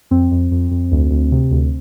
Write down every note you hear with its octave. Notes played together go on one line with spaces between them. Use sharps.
F2 C4
F2
F2
F2
D2
D2
C3
D2